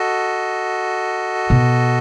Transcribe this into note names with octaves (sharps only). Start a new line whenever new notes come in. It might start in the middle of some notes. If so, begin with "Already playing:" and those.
Already playing: F#4 A4 D#5
B2